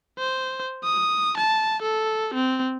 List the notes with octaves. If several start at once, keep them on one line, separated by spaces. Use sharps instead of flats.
C5
D#6
A5
A4
C4